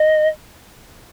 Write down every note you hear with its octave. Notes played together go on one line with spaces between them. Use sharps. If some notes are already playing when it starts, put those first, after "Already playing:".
Already playing: D#5